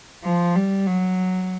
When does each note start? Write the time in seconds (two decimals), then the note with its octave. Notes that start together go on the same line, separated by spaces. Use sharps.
0.24 F3
0.56 G3
0.86 F#3